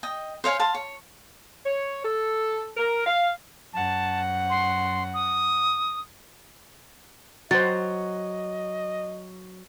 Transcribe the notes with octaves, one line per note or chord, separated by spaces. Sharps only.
D#5 G5
C5 C#5 F5 G#5
F5 A5 C6
C#5
C#5
A4
A#4
F5
F#2 F#5 A5
C6
D#6
F#3 F#4 C5 D#5 A6